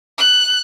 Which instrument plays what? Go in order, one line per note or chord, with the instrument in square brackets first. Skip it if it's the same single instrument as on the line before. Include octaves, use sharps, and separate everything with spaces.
[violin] F#6